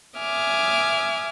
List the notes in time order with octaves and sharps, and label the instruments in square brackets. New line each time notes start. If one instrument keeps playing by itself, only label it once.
[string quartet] E5 G#5 D6 D#6 F6